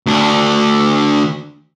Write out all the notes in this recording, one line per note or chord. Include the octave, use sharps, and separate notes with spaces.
D2 D4